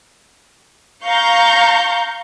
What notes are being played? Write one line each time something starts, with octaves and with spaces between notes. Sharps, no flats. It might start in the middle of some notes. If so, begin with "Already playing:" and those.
F5 A#5 C#6 G6